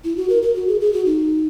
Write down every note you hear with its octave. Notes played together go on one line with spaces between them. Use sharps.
E4
F#4
A#4
A#4
F#4
G#4
G#4
F#4
D#4